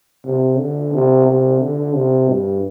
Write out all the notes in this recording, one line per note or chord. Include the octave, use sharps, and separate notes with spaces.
C3
D3
C3
C3
D3
C3
G2